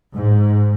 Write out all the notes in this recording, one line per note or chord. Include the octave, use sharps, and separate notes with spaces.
G#2